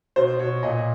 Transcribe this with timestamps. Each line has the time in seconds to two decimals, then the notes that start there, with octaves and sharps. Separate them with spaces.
0.16 B2 C5
0.39 B2 C#5
0.63 A#2 D#5